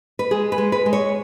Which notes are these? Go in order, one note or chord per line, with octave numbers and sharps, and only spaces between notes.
B4
G#3 G#4
B4
G#3
B4
G#3
C#5